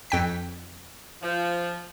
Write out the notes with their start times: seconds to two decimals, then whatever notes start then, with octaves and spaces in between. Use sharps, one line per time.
0.10 F2 G5 B6
1.22 F3